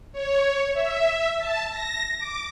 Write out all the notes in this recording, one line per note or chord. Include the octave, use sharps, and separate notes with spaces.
C#5
E5
A5
A#6
D6